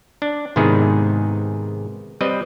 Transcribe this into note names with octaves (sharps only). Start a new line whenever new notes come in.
D4
G#2 C3 D#3 B3 E4 G#4
G3 C4 B4 D#5